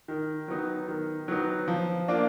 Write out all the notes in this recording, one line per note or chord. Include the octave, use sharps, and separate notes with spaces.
D#3
F#3 B3 D#4
D#3
F#3 B3 D#4
F3
A#3 D4 F4